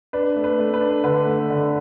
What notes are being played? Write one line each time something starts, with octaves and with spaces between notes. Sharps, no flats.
D4 B4
A3
B4
A3
B4
D4
D3 B4
A3
D3